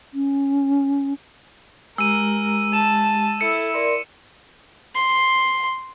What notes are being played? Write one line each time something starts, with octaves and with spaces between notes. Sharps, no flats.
C#4
G#3 G4 A#4 E6 D#7
A5 E7
E4 A4 C#7
A#4 D5 C6
C6